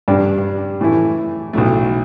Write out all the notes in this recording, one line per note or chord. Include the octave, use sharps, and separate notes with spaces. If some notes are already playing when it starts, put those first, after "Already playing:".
G2 G3 D4
A2 E3 A3 E4
B1 A2 A3